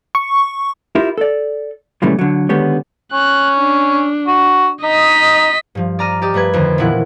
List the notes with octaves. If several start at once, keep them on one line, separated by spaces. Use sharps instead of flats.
C#6
E4 F4 G4 A#4
A4 D5
F#2 A#2 C#3 E3 G3 A3
D3 F#3
D3 D#3 G#3 B3 G4 C#5
C#4 F#6
D4
F#4
D#4 D#5 B6
G2 F3
D5 A#5 F6 D#7
G4 D5 D#5
G2 A3 B4 G#6
F2 D3 D#3
E1 A#2 E4 F#5